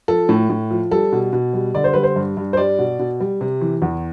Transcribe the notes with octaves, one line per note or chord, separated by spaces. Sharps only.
F3 A4
A2
A2
F3
G3 A4
B2
B2
G3
D3 D5
C5
G3 B4
C5
G2
G2
C5
G3 D5
B2
B2
G3
C3
E3
E2